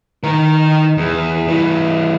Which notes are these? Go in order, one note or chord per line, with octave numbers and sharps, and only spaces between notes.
D#3 A#4
E2
E3 G3